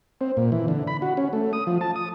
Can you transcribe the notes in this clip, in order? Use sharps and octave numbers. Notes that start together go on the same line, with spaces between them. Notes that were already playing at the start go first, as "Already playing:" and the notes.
C4
A#2
E3
D3
B5
F#4
C#4
A3
D#6
F3
A5
D#6